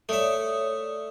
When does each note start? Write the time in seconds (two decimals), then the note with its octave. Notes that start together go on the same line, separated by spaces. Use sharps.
0.09 A3 C#5 D5 E5 D#6